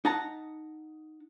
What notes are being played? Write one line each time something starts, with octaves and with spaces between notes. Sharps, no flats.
D#4 F#5 A5 A#5